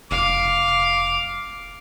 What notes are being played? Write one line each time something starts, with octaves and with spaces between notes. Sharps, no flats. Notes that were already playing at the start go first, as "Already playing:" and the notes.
F1 F5 D6